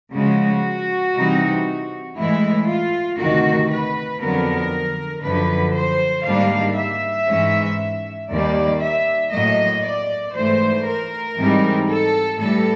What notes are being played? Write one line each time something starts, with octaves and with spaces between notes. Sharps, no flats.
C#3 F3 G#3 F#4
C3 E3 G3 C4 D#4
A2 E3 G#3 E4
F4
D2 C3 D#3 F#4
B4
F2 D3 F#3 B3 A#4
F#2 D3 F3 B4
C5
G#2 D#3 G3 A#3 D4 F5
E5
G#2 E3 G#3 C#4
D#2 D#3 G3 A#3 D5
E5
A2 F#3 A#3 D#5
D5
G#2 E3 A3 C5
A#4
G#2 E3 G3 C4 D#4
A4
A2 E3 G3 A4